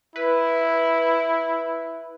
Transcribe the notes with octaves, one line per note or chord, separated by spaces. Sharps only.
E4 B4